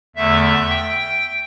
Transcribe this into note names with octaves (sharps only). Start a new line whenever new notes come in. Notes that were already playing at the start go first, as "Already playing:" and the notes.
E2 D3 A3 E5
G5